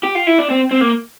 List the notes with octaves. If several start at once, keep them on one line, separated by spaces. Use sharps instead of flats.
G4
F4
E4
D4
C4
C4
A#3